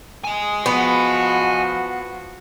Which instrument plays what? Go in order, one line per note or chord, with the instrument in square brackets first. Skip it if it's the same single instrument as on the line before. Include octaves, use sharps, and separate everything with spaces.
[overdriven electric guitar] D#5 G#5
[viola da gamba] F3 F#4 [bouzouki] B3